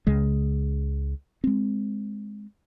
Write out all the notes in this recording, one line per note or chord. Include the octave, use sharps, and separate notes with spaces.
C#2 C#3 G#3
G#3 C4